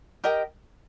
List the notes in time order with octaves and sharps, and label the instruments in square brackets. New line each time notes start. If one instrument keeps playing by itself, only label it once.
[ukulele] G4 A#4 D#5 G5